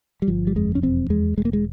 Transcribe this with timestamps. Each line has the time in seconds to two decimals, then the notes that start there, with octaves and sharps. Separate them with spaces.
0.22 G3
0.28 G1 F3
0.47 G3
0.56 F2 G#3
0.75 C#4
0.82 E1 C4
1.10 E2 G#3
1.37 E1 G#3
1.45 A#3
1.53 G#3